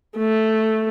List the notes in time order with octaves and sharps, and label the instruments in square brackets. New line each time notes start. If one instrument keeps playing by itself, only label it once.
[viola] A3